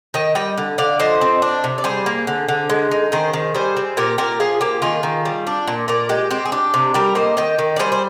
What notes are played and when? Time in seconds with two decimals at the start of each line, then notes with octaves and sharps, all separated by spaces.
0.14 D#3 D#5 G5
0.35 G3 D#5 G5
0.58 D3
0.78 D3 D5 F5
1.00 F3 C5 D#5
1.21 C4
1.42 D4
1.64 C3
1.78 D5
1.84 G3 G#4 C5
2.06 A#3
2.27 D3
2.48 D3
2.70 G#3
2.91 D#4
3.12 D#3 G#4 C5
3.33 D#3
3.55 G3 G#4 C5
3.77 C4
3.97 A#2 G4 A#4
4.18 A#2 G4 A#4
4.40 F3 F4 G#4
4.61 A#3 G4
4.82 D#3 F4 G#4
5.03 D#3
5.25 G3
5.47 D4
5.67 A#2
5.88 A#2 A#4 D5
6.09 G#3 G4
6.31 C4 G4
6.45 G#4
6.52 D4 G4
6.74 C3
6.94 G3 G4 A#4
7.15 A#3 C5 D#5
7.37 D#3 D#5 G5
7.59 D#3
7.76 D5
7.79 G3 G#4 C5
7.92 C5